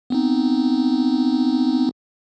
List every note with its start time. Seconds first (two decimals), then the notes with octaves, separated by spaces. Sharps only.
0.10 B3 C4 D#4